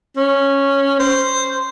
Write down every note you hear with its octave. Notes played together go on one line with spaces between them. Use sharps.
C#4
C5